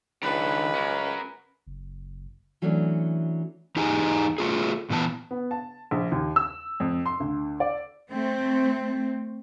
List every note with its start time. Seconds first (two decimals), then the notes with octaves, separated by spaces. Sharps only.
0.23 C#2 D#3 D4 B4
0.75 C#4 A#4
1.67 F#1
2.62 E3 F#3 A3 C#4 D4
3.76 E2 D#4 G4 G#4 G#5 A#5
4.38 A3 F4 G#4
4.90 A#2 E3 B3 A5
5.31 B3
5.51 A5
5.91 A#1
6.12 D#2
6.36 E6
6.80 F2
7.06 C6
7.20 D2
7.60 D5
8.12 A3 C4